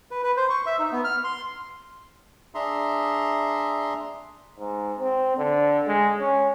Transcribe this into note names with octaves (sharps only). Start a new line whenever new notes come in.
B4
B4
C5
C#6
E5
D#4
B3
F6
C6
D4 G#4 E5 A#5 C6
G#2
C4
D3
G#3
C#4